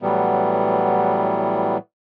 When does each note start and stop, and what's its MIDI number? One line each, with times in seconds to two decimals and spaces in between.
0.02 1.77 45
0.02 1.77 52
0.02 1.77 54
0.02 1.77 55
0.02 1.77 59